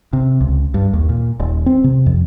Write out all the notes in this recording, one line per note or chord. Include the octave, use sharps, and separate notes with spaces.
C3
C#2
G2
D#2
A#2
D#1
C4
C3
F2